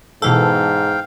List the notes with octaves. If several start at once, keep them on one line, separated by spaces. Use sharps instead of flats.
G#2 B2 E3 A4 F5 G5